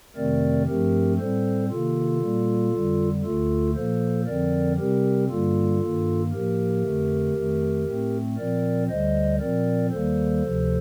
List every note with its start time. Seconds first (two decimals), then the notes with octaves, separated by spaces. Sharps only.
0.16 F2 C3 D#3 A3 C4 A#4 D5
0.67 G2 F3 A3 C4 G4 A#4
1.19 A2 G3 C4 A4 C5
1.70 C3 D#3 A#3 F4 A4
2.21 A#2 G3 A#3
2.73 F2 D3 G3
3.24 D2 D3 A3 F4 A4
3.75 A#2 F3 A#3 A4 C5
4.26 F2 D3 F3 C4 A#4 D5
4.78 C3 G3 C4 G4 A#4
5.29 G2 D3 G3 A#3 F4 A4
5.81 G2 D#3 A#3
6.32 A2 F3 A#3 G4 A#4
6.83 F2 D3 A3
7.34 F2 D#3 A3
7.86 A2 A3 C4
8.37 A#2 F3 C4 A#4 D5
8.88 D2 D3 G3 C5 D#5
9.40 A#2 F3 C4 A#4 D5
9.91 D#2 D#3 G3 A#3 A4 C5
10.42 D2 C3 F3